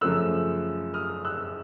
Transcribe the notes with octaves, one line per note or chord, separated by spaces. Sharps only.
F#2 C#3 F3 A3 E6 F#6
D#6 F6
E6 F#6